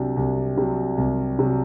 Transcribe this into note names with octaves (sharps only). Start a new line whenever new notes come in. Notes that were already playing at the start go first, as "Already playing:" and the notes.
Already playing: C2 C3 F#3 D4
C2
C3 F#3
C2
C3 F#3